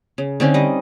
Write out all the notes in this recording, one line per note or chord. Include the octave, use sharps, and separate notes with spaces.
C#3
D3 C4 C#4 D#4
G3 D#5